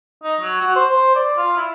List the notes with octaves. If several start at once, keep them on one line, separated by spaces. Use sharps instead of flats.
D#4
F#3
F#4
C5
C5
D5
F4
E4